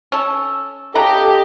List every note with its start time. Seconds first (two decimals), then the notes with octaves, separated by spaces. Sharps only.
0.12 C#4 A4
0.95 C#3 G4 A4 D#5 F#5 A#5